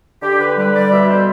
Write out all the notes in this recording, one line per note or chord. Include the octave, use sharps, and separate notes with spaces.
D3 G4
B4
G3 B4
D5
B2 E5
C5